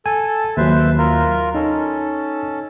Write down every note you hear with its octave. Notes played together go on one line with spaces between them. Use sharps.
A4 G#5
D#2 F#3 B4 C5 E5
F4 A#4
C#4 D#4 A4